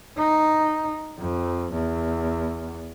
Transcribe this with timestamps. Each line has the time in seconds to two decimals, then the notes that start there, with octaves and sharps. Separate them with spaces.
0.18 D#4
1.18 F2
1.73 E2